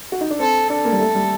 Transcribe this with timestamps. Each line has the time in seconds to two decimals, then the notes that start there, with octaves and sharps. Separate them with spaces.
0.12 F#4
0.21 D#4
0.30 D4
0.40 C4 A4
0.70 D4 A4
0.85 A#3
0.92 G3
1.00 A3
1.15 G3